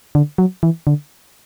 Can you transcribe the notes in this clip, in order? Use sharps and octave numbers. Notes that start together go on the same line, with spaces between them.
D3
F#3
E3
D3